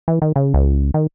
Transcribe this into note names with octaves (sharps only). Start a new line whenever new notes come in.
E3
D#3
C#3
C#2
D#3